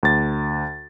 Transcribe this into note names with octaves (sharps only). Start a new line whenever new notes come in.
D2 A6